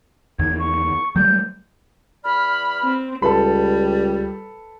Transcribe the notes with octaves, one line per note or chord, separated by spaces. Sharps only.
E2 D#3 G#6
C#6
F#3 G3 A3 G6
E2 D5 B5 F6
C4
C#2 G3 A4 B4 B5